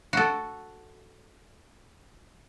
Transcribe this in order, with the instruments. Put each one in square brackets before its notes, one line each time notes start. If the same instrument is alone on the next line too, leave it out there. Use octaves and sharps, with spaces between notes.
[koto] F#4 A4